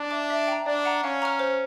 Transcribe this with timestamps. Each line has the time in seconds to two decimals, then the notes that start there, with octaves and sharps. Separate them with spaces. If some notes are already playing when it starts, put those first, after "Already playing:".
Already playing: D4
0.11 E5 A5 D6
0.30 E5
0.48 G5 A#5
0.66 D4 D5
0.85 F#5 A#5
1.03 C#4 F5
1.22 A#5 C#6 F6
1.39 C5